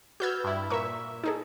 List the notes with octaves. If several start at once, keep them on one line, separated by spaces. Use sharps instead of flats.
F#4 B4 E6 F6 G6 G#6
G2 E4
A#2 A#4 E5 C#6
D#4 G#4 A4